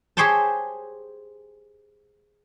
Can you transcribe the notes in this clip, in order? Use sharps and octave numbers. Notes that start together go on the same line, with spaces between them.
G4 G#4 C5 C#5 G5 A5